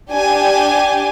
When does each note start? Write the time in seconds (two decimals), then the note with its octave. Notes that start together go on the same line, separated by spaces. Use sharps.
0.12 D4 G4 G#5